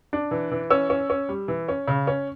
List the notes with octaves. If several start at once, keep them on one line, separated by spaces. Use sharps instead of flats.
D4
E3
E3
C#4 E6
C#4
C#4
G3
E3
C#4
C#3
C#4